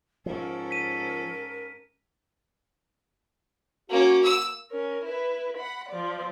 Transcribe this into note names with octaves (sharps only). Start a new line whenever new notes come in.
G#2 F3 C#4 A4 A#4
B6 D#7
A#3 C#4 F#4
E6
C#4 A#4
E4 B4
F#5 B5
F3 D5